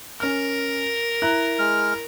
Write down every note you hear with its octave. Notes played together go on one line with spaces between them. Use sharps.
C#4 A#4 F6
E4 A#5 F#6
G#3 F6